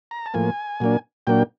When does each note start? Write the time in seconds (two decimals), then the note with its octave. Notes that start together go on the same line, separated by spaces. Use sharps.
0.11 A#5
0.26 A5
0.34 A2 F3 A#3 G#5
0.80 A#2 F#3 A#3 D4
1.27 A#2 F#3 A#3 D4 G5